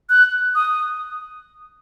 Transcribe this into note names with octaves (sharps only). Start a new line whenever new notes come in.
F#6
D#6